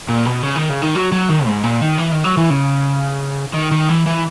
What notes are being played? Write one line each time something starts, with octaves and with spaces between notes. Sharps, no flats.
A#2
B2
C#3
D#3
C#3
D#3
F#3
F#3
D#3
G#2
A#2
D#3
E3
D#3
F#3
E3
C#3
D#3
D#3
E3
E3